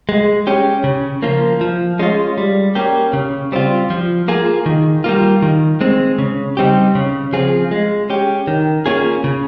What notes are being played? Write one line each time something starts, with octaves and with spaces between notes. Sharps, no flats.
G#3
C#4 G4
C#3
F3 A#3 F4
F3
G#3 C#4 F4
G3
A#3 C#4 G4
C#3
G3 C4 F4
F3
A#3 F4 G#4
D#3
G3 A#3 F4
D#3
G#3 C4
C#3
G3 C4 D#4 G4
C#3
F3 C4 F4 G#4
G#3
C#4 G4
D#3
A#3 C#4 F4 G#4
C#3